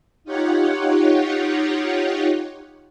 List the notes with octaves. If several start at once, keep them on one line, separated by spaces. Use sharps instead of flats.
D#4 F4 G4 C#5 F#5